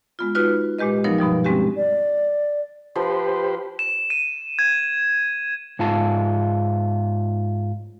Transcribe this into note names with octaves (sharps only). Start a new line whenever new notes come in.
G#3 B3 F4
D#4 F4 F#4 B4
A#2 G#3 G4 B4 D#5
F3 F#3 B3 D#4 A#4 C#5
G2 B2 F3 G3
G3 G#3 C4 C#4 F#4 G4
D5
F3 G4 B4 C5
E7
D#7
G#6
G#2 F4 A5